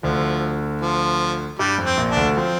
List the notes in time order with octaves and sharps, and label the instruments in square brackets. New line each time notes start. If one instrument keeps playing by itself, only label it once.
[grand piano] D2 D3 [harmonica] F3
[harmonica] F3
[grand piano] G2 [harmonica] G3
[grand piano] F2
[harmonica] C4
[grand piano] A#1 A#2
[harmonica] D4
[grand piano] D2 D3
[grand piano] F3 [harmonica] C4